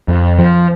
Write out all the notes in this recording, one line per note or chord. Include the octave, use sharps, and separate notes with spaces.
F2
F3